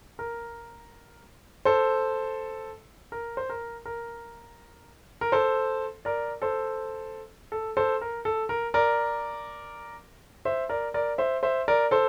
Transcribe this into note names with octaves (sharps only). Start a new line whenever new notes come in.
A#4
A4 C5
A#4
C5
A#4
A#4
A#4
A4 C5
A#4 D5
A4 C5
A4
A4 C5
A#4
A4
A#4
A#4 D5
C5 E5
A#4 D5
A#4 D5
C5 E5
C5 E5
A#4 D5
A4 C5